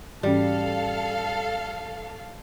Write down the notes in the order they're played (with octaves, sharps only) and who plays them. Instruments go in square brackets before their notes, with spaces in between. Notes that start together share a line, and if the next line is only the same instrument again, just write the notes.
[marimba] G#2 E3 C#4 [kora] G3 [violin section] A4 F5